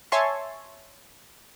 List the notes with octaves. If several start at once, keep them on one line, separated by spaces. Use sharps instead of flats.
C#5 E5 G#5 A5 C6 C#6